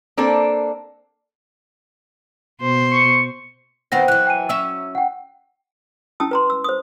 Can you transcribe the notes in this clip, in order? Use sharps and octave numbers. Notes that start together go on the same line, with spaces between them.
A#3 C4 D4 A4
B2 C5
C#6
D#3 B3 C4 C5 F#5 A#6
E3 F#3 F#6
G5 G#5 D#7
F#3 C#4 E5 E6
F#5 G5
C#4 E4 G5 A5 D#6 E6
B4 A#5 C6
E6
C5 D#6